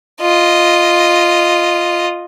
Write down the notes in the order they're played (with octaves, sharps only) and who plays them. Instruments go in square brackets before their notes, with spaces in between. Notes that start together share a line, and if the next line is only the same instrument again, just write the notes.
[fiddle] F4 D#5